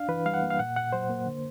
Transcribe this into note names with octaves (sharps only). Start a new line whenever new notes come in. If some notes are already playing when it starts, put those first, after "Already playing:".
Already playing: D4 F5
E3 B4
G3 F5
F#5
A#3
F5
A#2 F#5
A#2 F#5
F#3 C5
A#3
D3